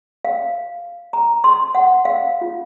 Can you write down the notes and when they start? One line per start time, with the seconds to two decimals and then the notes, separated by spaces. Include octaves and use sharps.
0.25 F5
1.13 A#5
1.44 C6
1.75 F#5
2.05 F5
2.41 F4